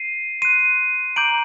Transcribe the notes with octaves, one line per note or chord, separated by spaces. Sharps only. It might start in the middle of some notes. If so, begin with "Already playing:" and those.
Already playing: C7 D#7
C6 F#6 C7 D#7
A#5 D6 G6 D7 F#7